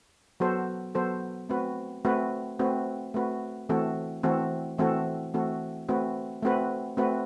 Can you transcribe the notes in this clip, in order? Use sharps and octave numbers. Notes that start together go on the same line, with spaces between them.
F#3 B3 F#4 A4 C5
F#3 B3 F#4 A4 C5
A3 C4 F#4 B4
A3 C4 F#4 B4
A3 C4 F#4 B4
A3 C4 F#4 B4
E3 A3 C4 F#4 A4
E3 A3 C4 F#4 A4
E3 A3 C4 F#4 A4
E3 A3 C4 F#4 A4
A3 C4 F#4 B4
A3 C4 F#4 B4
A3 C4 F#4 B4